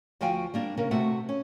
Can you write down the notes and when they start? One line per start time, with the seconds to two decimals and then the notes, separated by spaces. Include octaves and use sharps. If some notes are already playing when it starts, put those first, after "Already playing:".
0.21 D2 F3 F#4 F5 G5 G#5
0.54 G3 A#3 D4
0.77 C#3 A#3 C#4 A#4
0.91 C3 A3 F#4 E5 F#5
1.29 C#4